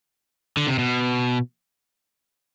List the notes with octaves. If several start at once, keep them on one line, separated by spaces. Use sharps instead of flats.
D3
C3
B2